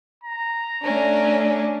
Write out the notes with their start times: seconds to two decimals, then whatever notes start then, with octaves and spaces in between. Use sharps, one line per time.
0.23 A#5
0.84 A3 C#4 D4